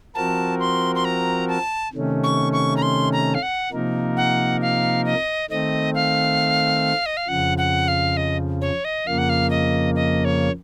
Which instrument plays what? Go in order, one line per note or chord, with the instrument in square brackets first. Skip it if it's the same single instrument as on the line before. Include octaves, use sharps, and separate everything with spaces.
[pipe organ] F3 C4 F#4 A#4 [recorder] A5
[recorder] C6
C6
A#5
A5
[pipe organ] C3 D#3 A3 C#4
[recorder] C#6
C#6
A#5
C6
A#5
F5
F#5
[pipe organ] C3 F3 A#3 D#4 A#4
[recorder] F#5
F5
D#5
[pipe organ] D#3 A3 C4 [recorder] D#5
[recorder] F5
D#5
F5
[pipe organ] F2 C#3 F3 [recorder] F#5
[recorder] F#5
F5
D#5
C#5
D#5
[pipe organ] F2 C#3 F3 A#3 [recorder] F5
[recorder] F#5
F5
D#5
D#5
C#5